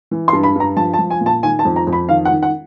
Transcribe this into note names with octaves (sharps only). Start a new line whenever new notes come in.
E3
C6
G2
B5
G2 A#5
F3 A5
A5
F3
G#5
A#2
A5
D#3 G#5
A5
F2
A#5
F2
B5
D#3 F5
F#5
D#3
F#5